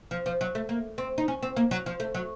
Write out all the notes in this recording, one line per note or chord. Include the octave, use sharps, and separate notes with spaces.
F3
F3
F#3
A3
A#3
C4
D#4
C#4
C4
A#3
F#3
F3
A3
F#3